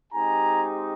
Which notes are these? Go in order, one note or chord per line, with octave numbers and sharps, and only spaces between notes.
G#3 C4 D#4 G4 G#5 A#5